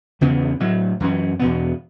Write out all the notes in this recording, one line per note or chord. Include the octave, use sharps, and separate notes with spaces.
E2 C#3 E3 B3
A2 F#3 A3
F#2 E3 C#4
E2 B2 B3